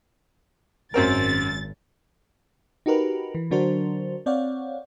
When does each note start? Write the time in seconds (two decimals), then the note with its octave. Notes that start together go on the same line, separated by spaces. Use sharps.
0.94 G#1 F#2 C4 A#4 A6
2.86 D#4 F#4 G4 A#4 B4
3.35 E3
3.51 D3 F#3 D4 F#4 A#4 C5
4.26 C4 C#5 D5 F5 F#5